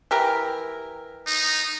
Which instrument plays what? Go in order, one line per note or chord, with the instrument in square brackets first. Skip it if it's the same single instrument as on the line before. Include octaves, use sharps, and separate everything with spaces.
[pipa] E3 G4 A#4
[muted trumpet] D#4